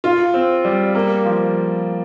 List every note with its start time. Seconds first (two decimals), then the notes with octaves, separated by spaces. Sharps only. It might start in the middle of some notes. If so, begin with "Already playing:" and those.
0.04 F4
0.34 C4
0.65 G3
0.95 A#3
1.25 F3